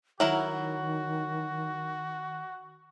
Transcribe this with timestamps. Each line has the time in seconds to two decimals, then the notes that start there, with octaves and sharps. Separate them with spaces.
0.20 D#3 F#3 E4 F#4 A#4